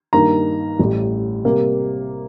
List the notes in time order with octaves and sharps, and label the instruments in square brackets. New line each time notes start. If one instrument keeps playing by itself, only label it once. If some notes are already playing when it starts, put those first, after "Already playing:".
[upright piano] G2 D#3 A#3 A#5
A1 A2 G3
C3 G3 A#3